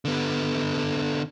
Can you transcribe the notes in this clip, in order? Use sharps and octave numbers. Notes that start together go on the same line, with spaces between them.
D3 B3